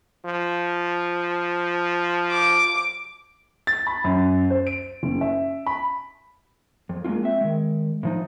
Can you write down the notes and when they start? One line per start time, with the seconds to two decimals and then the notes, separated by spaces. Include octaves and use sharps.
0.25 F3
2.31 D6
3.67 A6
3.87 B5
4.04 F#2
4.50 C5
4.67 D7
5.03 F#1
5.21 E5
5.66 B5
6.89 F2
7.04 G#3 A#3 C#4 D4 F4
7.23 C4 E5
7.41 D#3 G#3
8.03 A2 F3 D#4